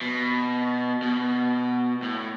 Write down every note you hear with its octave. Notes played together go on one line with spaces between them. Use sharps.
B2
B2
A2